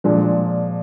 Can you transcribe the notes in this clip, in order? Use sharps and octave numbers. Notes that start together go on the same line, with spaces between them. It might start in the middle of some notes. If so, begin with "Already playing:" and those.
A#2 F3 G#3 D4